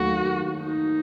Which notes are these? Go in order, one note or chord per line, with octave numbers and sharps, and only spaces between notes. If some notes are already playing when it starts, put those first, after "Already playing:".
Already playing: D#2 D#3 F#3 A3 F#4
D#4